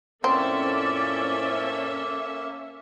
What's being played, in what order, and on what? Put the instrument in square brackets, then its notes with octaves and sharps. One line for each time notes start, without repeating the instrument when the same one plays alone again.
[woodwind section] F2 A2 D5 [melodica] A#3 [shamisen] C4 [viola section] C#4 A4 E5